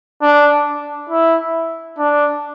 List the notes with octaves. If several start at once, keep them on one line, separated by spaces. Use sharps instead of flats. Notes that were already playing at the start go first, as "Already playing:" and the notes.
D4
E4
D4